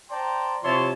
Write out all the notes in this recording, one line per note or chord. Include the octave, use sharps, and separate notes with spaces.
C5 D5 G5 A5 A#5 C6
C3 F3 E4 C#5 A5 C6